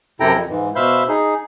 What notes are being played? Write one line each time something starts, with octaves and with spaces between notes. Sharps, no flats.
F#2 C3 E4 A4 G5 A#5
F2
G#2 E3
B2 C5 E5 F5 B5 G6
D#4 G#4